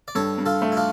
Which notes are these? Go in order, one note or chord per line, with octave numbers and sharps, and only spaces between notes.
D5
G2 A4 C#5
G2
F4 A4
A3
E4
D4 F4